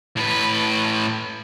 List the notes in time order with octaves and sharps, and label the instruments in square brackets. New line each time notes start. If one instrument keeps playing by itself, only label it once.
[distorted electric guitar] A2 B4